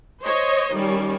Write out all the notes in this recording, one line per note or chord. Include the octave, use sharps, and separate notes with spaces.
C5 C#5 D#5
D#3 G3 C#4